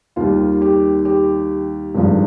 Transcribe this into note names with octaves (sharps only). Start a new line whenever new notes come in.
D#2 D#3 G3 F4
G4
G4
G#1 G2 F3